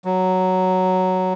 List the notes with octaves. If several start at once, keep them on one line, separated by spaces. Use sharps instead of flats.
F#3